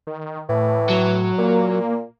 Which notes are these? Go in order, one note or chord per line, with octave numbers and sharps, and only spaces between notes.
D#3
A2 E3
F#3
A#2 A#3